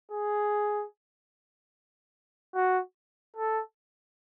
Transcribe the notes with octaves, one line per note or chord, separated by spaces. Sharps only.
G#4
F#4
A4